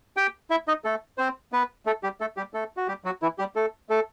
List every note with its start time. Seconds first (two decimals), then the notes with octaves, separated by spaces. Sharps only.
0.17 G4 G5
0.50 E4 E5
0.68 D#4 D#5
0.84 A3 A4
1.18 C4 C5
1.52 B3 B4
1.86 A3 A4
2.03 G3 G4
2.21 A3 A4
2.37 G3 G4
2.54 A3 A4
2.77 F#4
2.88 G3 G4
3.04 F#3 F#4
3.22 E3 E4
3.39 G3 G4
3.55 A3 A4
3.89 A3 A4